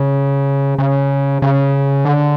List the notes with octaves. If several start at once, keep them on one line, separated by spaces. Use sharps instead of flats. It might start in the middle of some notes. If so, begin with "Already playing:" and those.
Already playing: C#3
C#3
C#3
D3